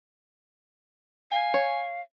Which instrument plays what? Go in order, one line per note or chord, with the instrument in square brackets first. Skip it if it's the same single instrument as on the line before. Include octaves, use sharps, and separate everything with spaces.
[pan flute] F5 [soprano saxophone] G#5
[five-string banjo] C#5